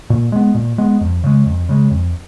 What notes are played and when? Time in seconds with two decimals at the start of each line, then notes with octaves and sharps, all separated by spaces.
0.10 A#2
0.32 G#3 B3
0.54 A#2
0.78 G#3 B3
1.01 F2
1.24 C#3 G#3
1.46 F2
1.69 C#3 G#3
1.91 F2